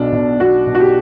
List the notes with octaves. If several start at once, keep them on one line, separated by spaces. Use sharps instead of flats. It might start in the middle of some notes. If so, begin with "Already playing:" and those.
Already playing: B1 B2 D4
B2
B1 F#4
B2
F#4
G4